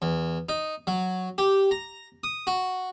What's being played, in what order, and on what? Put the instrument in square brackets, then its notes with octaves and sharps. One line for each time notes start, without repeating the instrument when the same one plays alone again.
[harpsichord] E2
D#4
F#3
G4
A#5
D#6
F#4